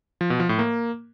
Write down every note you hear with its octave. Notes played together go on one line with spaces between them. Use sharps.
F3
B2
F3
A2
A#3